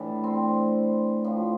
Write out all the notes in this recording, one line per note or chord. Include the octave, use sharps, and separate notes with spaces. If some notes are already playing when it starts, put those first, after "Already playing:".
Already playing: A2 E3 D4
C4
A2 F3